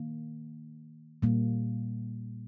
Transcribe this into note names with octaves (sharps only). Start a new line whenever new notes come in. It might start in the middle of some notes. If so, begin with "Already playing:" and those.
Already playing: D#3 A#3
A#2 G3 A#3